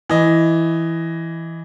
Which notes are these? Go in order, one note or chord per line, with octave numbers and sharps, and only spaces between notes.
E3 D#5